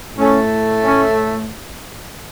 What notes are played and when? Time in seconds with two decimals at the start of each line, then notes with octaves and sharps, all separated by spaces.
0.17 A2 A3 C#4
0.84 C#4